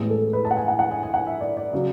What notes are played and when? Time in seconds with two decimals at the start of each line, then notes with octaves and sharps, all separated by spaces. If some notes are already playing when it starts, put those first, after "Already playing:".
Already playing: A1 A2 G#3 B3 G#4
0.10 A4
0.33 B4
0.45 A5
0.51 F#5
0.57 G#5
0.68 F#5
0.79 F#5
0.91 G#5
1.03 G#5
1.14 F#5
1.26 E5
1.41 D5
1.57 D5
1.73 C#3 F#3